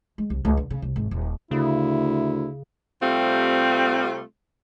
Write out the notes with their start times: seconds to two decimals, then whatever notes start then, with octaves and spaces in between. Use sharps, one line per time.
0.18 G#3
0.30 C2
0.45 C#2
0.57 D3
0.70 C#3
0.82 C2
0.96 G#1
1.11 D#1
1.51 D2 C#3 E4
3.03 C3 G3 A3 C4 F4